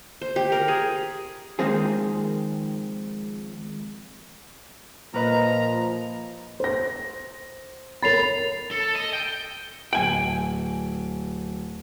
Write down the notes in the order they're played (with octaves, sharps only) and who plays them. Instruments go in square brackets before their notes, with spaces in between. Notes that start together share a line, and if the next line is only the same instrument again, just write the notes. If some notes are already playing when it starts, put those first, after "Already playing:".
[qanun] C5
G4
A#4
G#4
[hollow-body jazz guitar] D#3 F3 G#3 A#3 C4 G#4
[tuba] A#2 [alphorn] F3 [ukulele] A#4 B4 D#5 [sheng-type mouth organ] A#5
[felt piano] C5 A#6
[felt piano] A#4 C#5 B5 [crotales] A6 C7 F7
[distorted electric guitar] A4
D#5
G5
[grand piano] D1 F#7 [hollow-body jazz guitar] G5 G#5